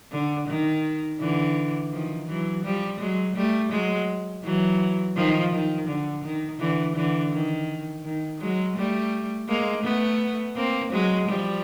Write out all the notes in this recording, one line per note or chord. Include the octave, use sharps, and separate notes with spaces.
D3
D#3
D3 E3
D#3 F3
E3 F#3
F3 G3
F#3 G#3
G3 A3
F#3 G#3
E3 F#3
D#3 F3
D#3
D3
D#3
D3 E3
D3 E3
D#3
D#3
F#3 G#3
G3 A3
G#3 A#3
A3 B3
A#3 C4
F#3 G#3
F3 G3